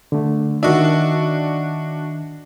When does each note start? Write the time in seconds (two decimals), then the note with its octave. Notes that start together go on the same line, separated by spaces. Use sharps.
0.12 D3 A3
0.63 D#3 D4 F#4 D#5 E5